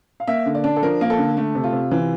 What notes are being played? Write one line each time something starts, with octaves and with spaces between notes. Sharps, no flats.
F5
A#3 E5
D3
D5
D4
A4
F3 A#4
A#3
A4
D3
A3
C3
F4
C3
E3